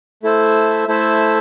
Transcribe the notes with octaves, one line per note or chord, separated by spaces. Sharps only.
A3 E4 A4 C5 E5
A3 E4 A4 C5 E5